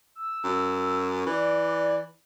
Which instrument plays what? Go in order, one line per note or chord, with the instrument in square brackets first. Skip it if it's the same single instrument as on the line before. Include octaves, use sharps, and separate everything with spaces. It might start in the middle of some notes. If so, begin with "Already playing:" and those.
[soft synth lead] E6
[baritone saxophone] F#2
[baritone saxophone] E3 [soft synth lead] D5